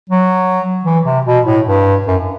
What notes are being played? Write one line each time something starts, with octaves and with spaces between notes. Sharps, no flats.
F#3
E3
C3
B2
A2
G2
F#2